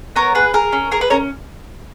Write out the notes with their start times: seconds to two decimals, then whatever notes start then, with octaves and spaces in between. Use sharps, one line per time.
0.16 B3 A#4 C#5
0.35 G#4 B4
0.54 G#4 A#4
0.73 C#4
0.92 G#4 A#4
1.01 B4
1.10 C#4 A#4 C#5